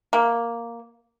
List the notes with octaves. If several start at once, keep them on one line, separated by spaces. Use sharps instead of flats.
A#3